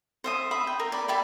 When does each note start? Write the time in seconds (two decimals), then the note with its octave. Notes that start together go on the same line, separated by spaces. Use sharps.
0.24 C5 E5 D#6
0.51 E5 B5 D#6
0.67 G5
0.80 A#4
0.92 D5 B5
1.08 G4 D5 E5 B5